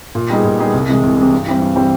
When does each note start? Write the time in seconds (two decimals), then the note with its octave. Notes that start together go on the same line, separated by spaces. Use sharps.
0.15 A#2
0.30 G3 B3 D#4 G#4
0.44 A#2
0.59 G3 B3 D#4 G#4
0.74 C2
0.89 C3 E3 G#3
1.03 C2
1.17 C3 E3 G#3
1.32 G2
1.47 E3 G3 C4
1.62 G2
1.76 E3 G3 C4